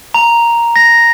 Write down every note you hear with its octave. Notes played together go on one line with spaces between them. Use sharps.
A#5
A#6